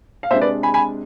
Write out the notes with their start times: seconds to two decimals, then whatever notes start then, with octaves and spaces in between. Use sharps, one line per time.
0.23 F5
0.31 C3 G#3 D4 C5 E5
0.41 B4 D5
0.63 G#5 B5
0.74 G#5 B5